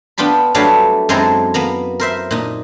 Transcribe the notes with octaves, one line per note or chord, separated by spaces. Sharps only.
B3 D4 F4 G5 B5
F#3 G3 A3 D4 B4 F5
F#2 G#3 C4 E4 A4 A#5
A#3 B3 A#5
A#4 C5 E5
A#2 D#4